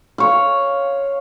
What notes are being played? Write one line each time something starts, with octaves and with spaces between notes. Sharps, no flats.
C#5 F5